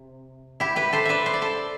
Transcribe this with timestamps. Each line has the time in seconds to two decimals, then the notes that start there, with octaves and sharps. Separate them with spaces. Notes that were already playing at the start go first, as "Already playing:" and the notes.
Already playing: C3
0.60 E4 G4
0.76 G4 B4
0.93 A4 C5
1.05 B4 D5 E5
1.26 C5
1.34 D5
1.42 A4 C5